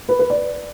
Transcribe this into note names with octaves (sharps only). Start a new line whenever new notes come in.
B4
B4
D5